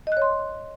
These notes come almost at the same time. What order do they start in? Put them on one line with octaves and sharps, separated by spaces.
D#5 F#6 C#5 C6